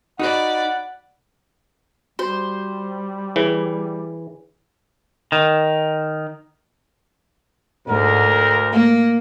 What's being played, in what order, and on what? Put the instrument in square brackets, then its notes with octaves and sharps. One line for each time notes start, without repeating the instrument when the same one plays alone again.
[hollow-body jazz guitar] D#4 [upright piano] F#4 [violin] D5 B5 [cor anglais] F#5
[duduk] G3 [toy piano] F#4 [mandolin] C5
[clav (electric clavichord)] E3 [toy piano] G#4 C#5
[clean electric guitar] D#3
[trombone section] D2 D3 A#4 [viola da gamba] G#2
[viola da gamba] A#3